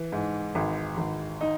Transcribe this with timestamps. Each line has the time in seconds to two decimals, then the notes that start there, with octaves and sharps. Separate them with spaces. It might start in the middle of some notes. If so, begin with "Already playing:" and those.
Already playing: E3
0.12 G#2
0.55 G#1
0.97 G#1
1.41 D#4